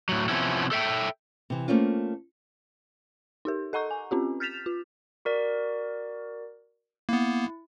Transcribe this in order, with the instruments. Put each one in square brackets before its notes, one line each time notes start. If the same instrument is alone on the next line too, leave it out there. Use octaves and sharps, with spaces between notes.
[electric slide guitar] A2 F#3
C3 F3 B3 C#4 E4
A4 E5 G5
[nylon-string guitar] C3 E3
A3 A#3 C4 C#4 F4
[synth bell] D#4 G4 A#4
A4 D#5 F#5 A#5 C#6 G6
G#5
C4 C#4 F4 G4
F6 G6 A6 B6 E7 F7
F4
[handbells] F#4 A#4 D5
[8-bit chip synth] A#3 B3 [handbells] E4